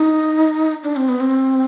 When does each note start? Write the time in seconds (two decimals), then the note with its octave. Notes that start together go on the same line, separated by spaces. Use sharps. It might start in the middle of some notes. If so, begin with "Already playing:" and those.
Already playing: D#4
0.84 D4
0.96 C4
1.09 B3
1.20 C4